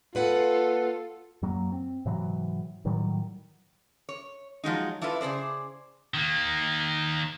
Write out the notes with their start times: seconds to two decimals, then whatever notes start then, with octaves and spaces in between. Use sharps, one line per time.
0.15 A#3 F4 A4 B4 F#5
1.42 F#2 F#3 A#3
1.72 C4
2.05 G#2 C3 E3 F#3
2.85 A2 D#3 F#3 G3
4.09 C#5
4.64 F3 F#3 G#3 D#4
5.01 D4 E4 F4 A4 B4
5.21 C#3 G#4 C5 D5
6.14 D#3 A#3